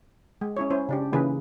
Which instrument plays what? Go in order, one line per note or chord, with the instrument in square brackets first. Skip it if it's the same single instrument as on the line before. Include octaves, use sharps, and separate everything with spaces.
[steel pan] G#3
C#4 E4 C#5
C#4 E4 C5
C#3 D4 G4
C#3 E3 A#3 D#4 G#4 B4